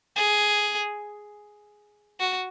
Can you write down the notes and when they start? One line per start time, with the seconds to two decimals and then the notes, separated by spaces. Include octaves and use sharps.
0.16 G#4
2.20 F#4